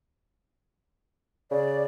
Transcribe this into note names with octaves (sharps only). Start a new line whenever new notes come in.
C#3 D5